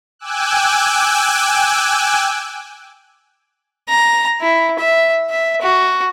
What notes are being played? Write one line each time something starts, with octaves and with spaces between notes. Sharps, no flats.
G5 G#5 D6 E6 F#6
A#5
E4
E5
E5
F#4